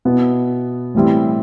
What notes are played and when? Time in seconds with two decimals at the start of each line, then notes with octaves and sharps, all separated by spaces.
0.05 B2 B3 E4
0.94 A2 E3 G3 C4 E4